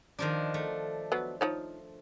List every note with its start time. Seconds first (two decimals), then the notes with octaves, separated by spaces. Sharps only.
0.19 D#3 F3 D4
0.54 A3
1.12 F#3 B3
1.41 F3 D#4 C#5